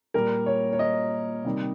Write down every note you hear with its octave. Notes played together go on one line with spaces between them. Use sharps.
A#2 G3 A#4
C#5
C#5
D#5
C3 D#3 G3